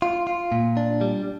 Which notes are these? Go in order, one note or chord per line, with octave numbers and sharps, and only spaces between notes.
F4
F4
A#2
D4
G3